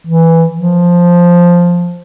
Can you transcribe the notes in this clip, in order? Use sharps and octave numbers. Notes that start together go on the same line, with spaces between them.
E3
F3